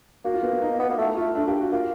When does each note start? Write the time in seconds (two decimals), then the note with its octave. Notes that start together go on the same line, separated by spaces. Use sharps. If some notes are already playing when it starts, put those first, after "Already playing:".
0.25 A#3 F#4
0.34 F4
0.42 B3
0.53 B3
0.62 D#4
0.80 B3
0.89 A#3
0.98 A3 E4
1.17 A3 F4
1.35 A3 D4
1.48 A#3 G4
1.60 F#4
1.72 A#3 F4